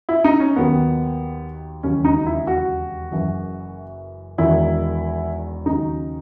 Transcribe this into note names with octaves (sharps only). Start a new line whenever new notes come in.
E4
D#4
C#4
D#2 D#3 F#3 B3
E1 D#2 C#3 F#3 C#4
D#4
E4
F#4
F#1 F#2 E3
E1 E2 D#3 E4
D#2 C#3 F#3 D#4